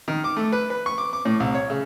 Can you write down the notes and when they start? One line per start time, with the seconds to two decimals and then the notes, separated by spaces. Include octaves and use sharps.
0.08 D#3
0.24 D6
0.37 A3
0.52 B4
0.70 B4
0.86 C#6
0.98 D6
1.13 D6
1.25 A2
1.40 C2
1.55 C#5
1.70 C#3